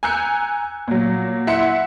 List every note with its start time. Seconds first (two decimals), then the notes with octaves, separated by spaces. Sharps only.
0.03 G#5 A#5 E6 F#6 G6 C#7
0.88 A#2 F#3
1.47 E4 E5 F#5 C6 C#7